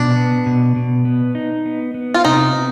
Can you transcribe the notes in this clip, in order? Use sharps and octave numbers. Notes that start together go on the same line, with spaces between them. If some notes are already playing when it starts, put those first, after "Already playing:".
Already playing: B2 D4
B3
B2
B2
B3
D#4
B3
B3
F4
C3 D#4
B3